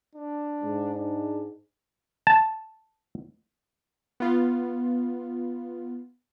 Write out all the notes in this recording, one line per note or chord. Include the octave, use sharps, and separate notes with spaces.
D4
G#2
D4
A5
B3 F4